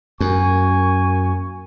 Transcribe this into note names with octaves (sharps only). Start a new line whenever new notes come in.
F#2 A#3 G#5 C#6